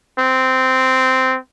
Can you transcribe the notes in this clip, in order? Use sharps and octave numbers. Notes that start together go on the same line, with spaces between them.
C4